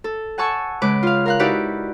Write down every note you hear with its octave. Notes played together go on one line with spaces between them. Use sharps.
A4
F#5 G#5 A5 C#6 E6
C#3 G#3 B4 D6
F4 F5
A#4 F5 F#6
D#4 E4 F#4 G4 B4 D5